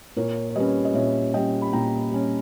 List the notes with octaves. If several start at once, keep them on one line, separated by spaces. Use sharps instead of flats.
A#2 A#4 C#5
C#5
G3 C#4 B4 D#5
D#5
A#2 C#5 E5
G3 C#4 D#5 G5
B5
A#2 G5 A#5
G3 C#4